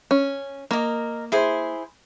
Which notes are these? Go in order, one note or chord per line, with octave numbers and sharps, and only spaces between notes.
C#4
A#3 A#4 D#5
E4 G#4 C5